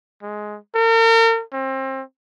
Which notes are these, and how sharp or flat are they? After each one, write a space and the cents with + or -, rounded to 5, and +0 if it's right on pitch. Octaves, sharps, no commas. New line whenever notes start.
G#3 +10
A#4 -40
C4 +30